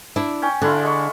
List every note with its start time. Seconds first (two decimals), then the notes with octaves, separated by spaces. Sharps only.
0.16 D4 E4
0.42 C#4 G5 G#5
0.62 D3 D4 E4 F4
0.83 G#3 C#6